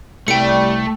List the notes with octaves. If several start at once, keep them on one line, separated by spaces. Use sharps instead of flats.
C2 G3 A3 G5 C#7